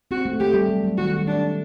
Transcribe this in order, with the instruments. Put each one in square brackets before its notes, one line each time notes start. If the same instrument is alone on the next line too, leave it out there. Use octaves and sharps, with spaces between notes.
[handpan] C4 [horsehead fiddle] F#4
[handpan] A3
[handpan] A3 [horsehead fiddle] G4
[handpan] G3
F#3
F#3
[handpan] D#3 [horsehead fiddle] F#4
[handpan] F#3
G3
[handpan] A3 [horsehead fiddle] D4